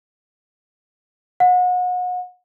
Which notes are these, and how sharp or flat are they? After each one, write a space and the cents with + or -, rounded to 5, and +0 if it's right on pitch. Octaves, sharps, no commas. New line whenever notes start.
F#5 -35